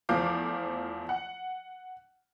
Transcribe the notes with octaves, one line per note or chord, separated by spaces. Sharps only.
E2 F3 A3 F5 D6 G6
F#5